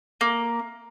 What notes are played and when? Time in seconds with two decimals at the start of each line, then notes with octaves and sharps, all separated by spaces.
0.21 A#3